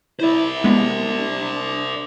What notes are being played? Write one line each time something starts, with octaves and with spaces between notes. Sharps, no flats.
E4 C5 D5
G#3 B3 D4